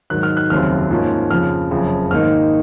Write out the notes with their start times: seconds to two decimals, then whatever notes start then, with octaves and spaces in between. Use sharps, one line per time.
0.10 G#2 D#3 F#3 F#6
0.23 F6
0.37 F#6
0.50 F1 D#2 C#3 F#3 C4 F6
0.90 G#2 F3 A#3 C#4
1.31 F2 C#3 F3 F6
1.71 F#1 F2 C#3 F3
2.11 G#2 D#3 A#3 D#4 F6